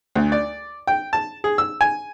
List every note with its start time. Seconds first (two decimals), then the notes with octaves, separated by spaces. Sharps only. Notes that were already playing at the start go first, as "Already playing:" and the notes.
0.15 D2
0.32 D5
0.87 G5
1.13 A5
1.44 G#4
1.58 E6
1.81 G#5